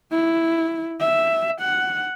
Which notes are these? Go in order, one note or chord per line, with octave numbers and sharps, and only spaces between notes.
E4
E5
F#5